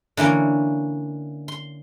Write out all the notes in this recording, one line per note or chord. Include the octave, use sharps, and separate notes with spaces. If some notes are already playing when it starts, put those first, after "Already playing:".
D3 E3 A#3 C#4
C6